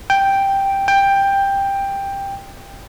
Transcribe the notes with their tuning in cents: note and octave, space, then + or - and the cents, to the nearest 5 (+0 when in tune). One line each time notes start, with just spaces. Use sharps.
G5 +0
G5 +10